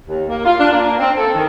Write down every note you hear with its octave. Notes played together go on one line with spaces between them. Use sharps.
D#2
A#3
F4
D4
A#3
C4
A4
D#3